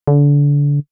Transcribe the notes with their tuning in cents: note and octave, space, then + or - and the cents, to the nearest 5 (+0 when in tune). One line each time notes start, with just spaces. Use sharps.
D3 -30